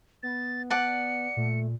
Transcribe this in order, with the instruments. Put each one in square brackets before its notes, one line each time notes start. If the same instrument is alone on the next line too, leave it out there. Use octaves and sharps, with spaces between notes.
[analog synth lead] B3 [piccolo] A6
[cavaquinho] D5 F#5 A5 [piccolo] C#7
[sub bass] A#2 [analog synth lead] A3